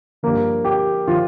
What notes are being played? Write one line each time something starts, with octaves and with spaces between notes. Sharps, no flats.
G2 F3 A#3
G4
F3 F4